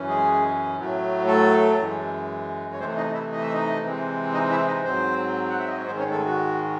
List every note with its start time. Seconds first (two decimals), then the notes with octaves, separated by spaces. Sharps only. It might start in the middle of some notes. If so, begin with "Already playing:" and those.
Already playing: F#2 E3 C#4
0.08 G#3 G#4
0.77 A2 F#3 A3
1.26 A3 A4
1.78 F#2 E3 G#3
2.73 C#5
2.80 C3 E3 A3 C4 C5
2.97 D#4 D#5
3.14 E4 E5
3.32 D#5
3.42 E5
3.54 D#4 D#5
3.82 C3 E3 G#3 C4
4.33 D#4 D#5
4.51 E4 E5
4.68 D#4 D#5
4.84 G#2 F#3 C4 C5
5.50 F#5
5.60 E5
5.68 D#5
5.77 C#5
5.87 G#2 D#3 G#3 C4 C5
5.99 C#4 C#5
6.11 A3 A4
6.25 F#4